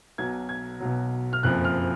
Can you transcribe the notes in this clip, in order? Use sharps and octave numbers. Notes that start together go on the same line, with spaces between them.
B1 B2 F#3 G#6
G#6
B1 B2 F#3
F6
F#1 F2 F3 F#6
F6